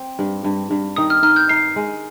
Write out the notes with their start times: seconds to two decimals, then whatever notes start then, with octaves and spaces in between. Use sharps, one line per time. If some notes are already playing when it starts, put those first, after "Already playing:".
Already playing: C4
0.19 G2
0.44 G2
0.71 G2
0.96 D#3 D#6
1.10 F6
1.23 D#4 F6
1.36 G6
1.49 D#4 C7
1.76 G#3